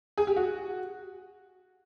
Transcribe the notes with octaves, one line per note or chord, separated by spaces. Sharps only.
G#4
G4
F#4